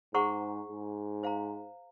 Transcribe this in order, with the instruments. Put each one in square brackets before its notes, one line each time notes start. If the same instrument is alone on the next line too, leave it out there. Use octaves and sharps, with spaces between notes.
[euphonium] G#2 [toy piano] G#4 C5 F#5 A#5 C#6
[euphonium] G#2
[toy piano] C5 F5 A#5